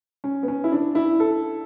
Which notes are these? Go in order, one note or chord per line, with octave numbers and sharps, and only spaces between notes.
C#4
B3
C#4
E4
D4
E4
A4